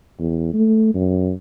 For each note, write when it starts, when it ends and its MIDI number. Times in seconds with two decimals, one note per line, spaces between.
0.20 0.52 40
0.53 0.94 57
0.94 1.32 42